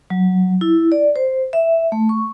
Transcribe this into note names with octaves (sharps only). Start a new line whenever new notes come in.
F#3
E4
D5
C5
E5
A3
C#6